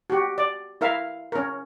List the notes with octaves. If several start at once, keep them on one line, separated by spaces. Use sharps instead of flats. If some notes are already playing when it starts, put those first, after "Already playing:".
F#4 G4
D5
E4 A#4 E5 F5
C#4 A#4